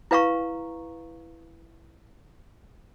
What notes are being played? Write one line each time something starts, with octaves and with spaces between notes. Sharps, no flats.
E4 B4 F5 A#5 C#6